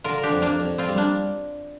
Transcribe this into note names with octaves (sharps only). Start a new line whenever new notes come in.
D3 F4 A#4
D4 G4
F2
A#3 D4
F2
C4 F4
G3
A#3 D4